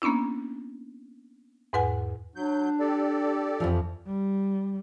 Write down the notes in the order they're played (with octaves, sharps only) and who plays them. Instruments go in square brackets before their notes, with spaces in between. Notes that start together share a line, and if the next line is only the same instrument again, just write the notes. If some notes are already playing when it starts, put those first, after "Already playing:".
[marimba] A#3 B3 C#4 D4 E4
E2 G#2 B4 F#5 G#5
[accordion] F#3 G6 [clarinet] D4
[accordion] G4 A4 D5
[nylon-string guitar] F2 E3 F3
[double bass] G3